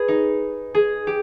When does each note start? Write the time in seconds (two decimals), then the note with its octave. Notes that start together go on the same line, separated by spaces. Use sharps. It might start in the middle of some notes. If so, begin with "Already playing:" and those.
Already playing: G#4 B4
0.08 D#4
0.75 G#4
1.07 G4